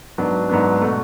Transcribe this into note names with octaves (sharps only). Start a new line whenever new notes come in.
G#2 F#3 B3 D4
G#2 F#3 B3 D4
B2 A3